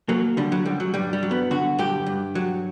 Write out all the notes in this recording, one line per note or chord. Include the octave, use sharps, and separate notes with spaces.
F#3 A#3
D3 G3
F#3
F#2 G3
F#3
G2 G3
G3
F#3
B3
D3 F#4
G2 G4
G2
F#3